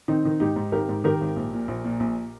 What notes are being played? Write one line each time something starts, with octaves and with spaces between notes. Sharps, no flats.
D#3 C4 D#4
D#3
G#2 D#4 G4
G#2
G#1 G4 A#4
G#2
D#3 G4 A#4
G#1
A#1
A#2
A#1
A#2
A#1